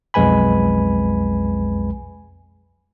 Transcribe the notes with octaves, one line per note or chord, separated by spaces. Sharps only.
B1 F2 G#3 B4 G#5 B5